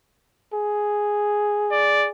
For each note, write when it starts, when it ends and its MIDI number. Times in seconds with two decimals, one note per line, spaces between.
0.54 2.12 68
1.72 2.08 74